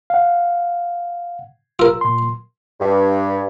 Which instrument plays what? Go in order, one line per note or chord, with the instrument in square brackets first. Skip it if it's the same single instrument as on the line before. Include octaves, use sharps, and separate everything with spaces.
[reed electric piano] F5 F#5
[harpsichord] F4 A#4 [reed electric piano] E6
[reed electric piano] A#2 C6
[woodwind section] G2